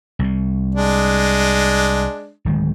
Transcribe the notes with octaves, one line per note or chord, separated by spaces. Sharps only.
C2 C3
G#3 D4
D1 D#3 G#3